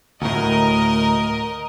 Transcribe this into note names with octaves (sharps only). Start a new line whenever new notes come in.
D2 A2 A#4 D#5